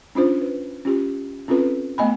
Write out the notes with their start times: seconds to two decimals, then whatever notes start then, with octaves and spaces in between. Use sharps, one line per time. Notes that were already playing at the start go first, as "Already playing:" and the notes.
0.15 C#4 D4 F4 C5
0.41 B4
0.85 C#4 F4 G4
1.48 C4 C#4 F4 A4 B4
1.98 A3 B3 D#5 G#5 B5